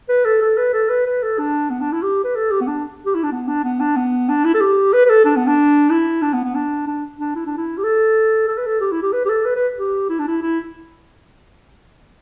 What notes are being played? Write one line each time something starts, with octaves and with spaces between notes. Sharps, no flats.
B4
A4
A4
B4
A4
B4
B4
A4
D4
B3
D4
E4
G4
B4
A4
G4
B3
D4
G4
E4
D4
B3
D4
B3
D4
B3
D4
E4
A4
G4
B4
B4
A4
D4
B3
D4
E4
D4
B3
B3
D4
D4
D4
E4
D4
E4
G4
A4
A4
B4
A4
G4
E4
G4
B4
G4
A4
B4
B4
G4
E4
D4
E4
E4